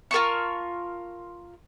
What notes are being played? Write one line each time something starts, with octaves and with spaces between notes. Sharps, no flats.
F4 A#4 A5 C#6